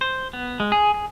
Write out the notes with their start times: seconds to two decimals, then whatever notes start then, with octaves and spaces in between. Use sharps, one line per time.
0.01 C5
0.33 B3
0.60 G#3
0.72 G#4
0.94 G#4